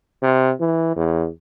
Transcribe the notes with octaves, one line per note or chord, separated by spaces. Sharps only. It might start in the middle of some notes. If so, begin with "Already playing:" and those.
C3
E3
E2